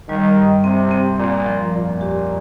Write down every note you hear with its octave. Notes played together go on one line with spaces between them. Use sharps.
D#3 G3
G2
C3 C4
C4
A#2 C4
F3
F2 A#2
G4